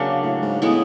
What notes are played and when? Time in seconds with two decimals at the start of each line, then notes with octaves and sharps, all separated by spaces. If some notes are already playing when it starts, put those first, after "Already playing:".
Already playing: C#3 F#3 A#3 D4
0.23 A2
0.42 G#2
0.62 A2 G#3 B3 E4